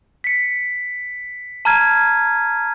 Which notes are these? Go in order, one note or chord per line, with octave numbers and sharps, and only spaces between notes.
B6 C#7
A5 A#5 F6 G#6 D#7